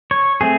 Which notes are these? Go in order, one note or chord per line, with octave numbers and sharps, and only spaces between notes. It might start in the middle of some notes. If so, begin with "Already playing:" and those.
C#5
A3 C4 G#4